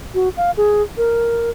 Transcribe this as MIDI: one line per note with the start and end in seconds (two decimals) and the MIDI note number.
0.14 0.29 66
0.37 0.51 77
0.57 0.82 68
0.97 1.50 70